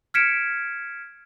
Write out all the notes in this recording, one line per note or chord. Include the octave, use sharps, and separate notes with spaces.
F6 G#6 B6 C#7 D7 E7